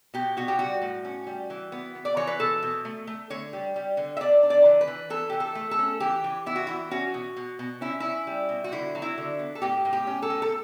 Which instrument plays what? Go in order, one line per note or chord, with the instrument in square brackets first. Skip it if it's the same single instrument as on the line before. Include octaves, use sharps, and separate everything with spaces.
[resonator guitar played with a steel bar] B2 G4
B2 F#4
G4
G3 F#4
A2
C#4
G3
E3
B3
B3
D5
E3 C#5
B4
B2 A4
B2
A3
A3
D3 C#5
G3
G3
D3
E5
D4 D5
D4
D5
E3
B4
E3
E3 A4
E3 G4
A4
A3
A4
C#4
E3 G4
E3
B3 E4
F#4
E3 E4
C#4 F#4
B2
B2
B2
C#4 E4
C#4 E4
G3
B2
F#4
D3 E4
F#3
E4
D3
B3
A4
A2 G4
A2
G4
C#4
A4
A2
A4